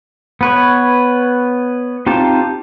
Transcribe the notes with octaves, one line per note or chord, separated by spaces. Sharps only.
B3 B4 C#5
C4 D#4 F4 G4 A5